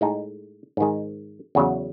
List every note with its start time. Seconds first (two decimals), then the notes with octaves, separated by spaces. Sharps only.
0.01 A2 G#3 D#4
0.77 G#2 D#3 G#3
1.55 E2 C#3 F#3